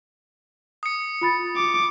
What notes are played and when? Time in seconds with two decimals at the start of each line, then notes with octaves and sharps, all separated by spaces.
0.83 D#6 C#7
1.21 F4 B5 A6
1.56 D6